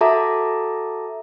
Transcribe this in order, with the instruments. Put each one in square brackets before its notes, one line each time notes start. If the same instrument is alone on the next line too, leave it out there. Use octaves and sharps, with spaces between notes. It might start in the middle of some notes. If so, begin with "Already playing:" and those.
[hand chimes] F#4 A4 E5 A5 A#5 D6